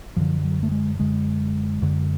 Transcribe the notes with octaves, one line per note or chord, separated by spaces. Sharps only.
F#2 D3 F3
F#3
A3
G#3
F#2 D3 G#3
F#2 D3